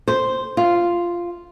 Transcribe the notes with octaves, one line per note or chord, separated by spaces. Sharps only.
C5
F4